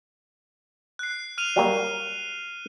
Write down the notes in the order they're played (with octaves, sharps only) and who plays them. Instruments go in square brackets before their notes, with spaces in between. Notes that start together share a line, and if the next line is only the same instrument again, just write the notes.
[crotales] F#6 C7
F6 D#7 F7
[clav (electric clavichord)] F#3 G3 A#3